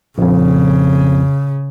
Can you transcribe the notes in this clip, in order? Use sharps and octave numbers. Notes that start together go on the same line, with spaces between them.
A#1 F2 C#3